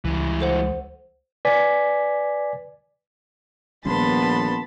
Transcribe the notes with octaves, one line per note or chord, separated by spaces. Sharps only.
C#2 E3 G3
A4 C5 F#5
B4 D5 G#5 B6
A#1 D#3 G3 B3 C#4 A5 B5 C6